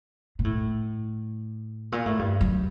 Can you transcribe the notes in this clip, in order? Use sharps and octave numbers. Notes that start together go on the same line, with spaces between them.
A#2
A2
A#2
A2
G2
F#2